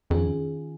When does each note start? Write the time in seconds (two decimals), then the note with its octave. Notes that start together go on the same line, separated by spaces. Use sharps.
0.10 F2 D#3 C#4 F4 G#4